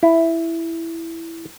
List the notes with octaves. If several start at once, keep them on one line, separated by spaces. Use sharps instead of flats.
E4